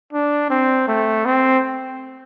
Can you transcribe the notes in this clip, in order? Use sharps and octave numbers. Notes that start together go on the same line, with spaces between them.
D4
C4
A3
C4